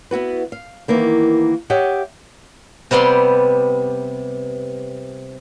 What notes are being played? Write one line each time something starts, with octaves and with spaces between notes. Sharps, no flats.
B3 E4 F#4 B4
F5
D#3 E3 A#3 B3
G4 C#5 D#5 E5 F#5
C3 G3 B3 D5 C6